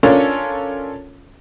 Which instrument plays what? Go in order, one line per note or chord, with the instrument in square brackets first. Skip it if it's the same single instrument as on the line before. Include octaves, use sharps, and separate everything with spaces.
[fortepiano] C#4 D4 F4 A4 A#4 C#5